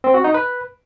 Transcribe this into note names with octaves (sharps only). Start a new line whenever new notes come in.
C4
F#4
D#4
B4